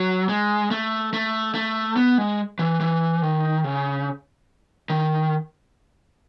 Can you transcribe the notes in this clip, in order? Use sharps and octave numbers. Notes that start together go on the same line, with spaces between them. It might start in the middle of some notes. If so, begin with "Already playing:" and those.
Already playing: F#3
G#3
A3
A3
A3
B3
G#3
E3
E3
D#3
C#3
D#3